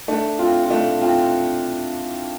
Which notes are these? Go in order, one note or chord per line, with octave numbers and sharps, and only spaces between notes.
A3 D4
C4 F4
F4
A3 D4
C4 F4